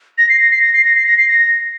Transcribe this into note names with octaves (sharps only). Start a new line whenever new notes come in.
A#6
C7
A#6
C7
A#6
C7
A#6
C7
A#6
C7
A#6